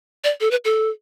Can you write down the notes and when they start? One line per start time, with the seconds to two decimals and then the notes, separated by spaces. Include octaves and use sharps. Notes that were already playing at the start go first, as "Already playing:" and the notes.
0.24 D5
0.40 A4
0.51 B4
0.65 A4